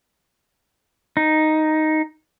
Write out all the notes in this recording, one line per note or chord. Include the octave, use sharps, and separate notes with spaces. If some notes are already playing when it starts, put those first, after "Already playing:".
D#4